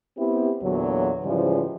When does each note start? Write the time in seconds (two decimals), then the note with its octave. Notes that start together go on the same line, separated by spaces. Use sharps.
0.18 B3 C4 E4 G4
0.62 E2 A#2 D3 F#3
1.24 G#2 C#3 E3 F3 G3